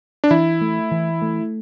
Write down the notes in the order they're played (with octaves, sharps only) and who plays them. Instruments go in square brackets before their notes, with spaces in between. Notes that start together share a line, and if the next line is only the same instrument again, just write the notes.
[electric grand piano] D4
[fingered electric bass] E3 [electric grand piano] E4
[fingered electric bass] A3
E3
A3